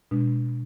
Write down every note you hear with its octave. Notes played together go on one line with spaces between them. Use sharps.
B2 G#3 D4